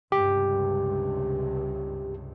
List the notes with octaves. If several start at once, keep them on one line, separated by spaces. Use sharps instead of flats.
C#2 G2 C3 G4